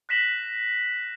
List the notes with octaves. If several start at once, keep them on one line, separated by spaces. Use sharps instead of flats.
F#6 A#6 B6 E7 F#7